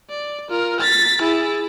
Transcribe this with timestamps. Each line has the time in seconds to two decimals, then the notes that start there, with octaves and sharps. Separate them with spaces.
0.10 D5
0.50 F4 A#4
0.81 A6 B6
1.22 E4 G#4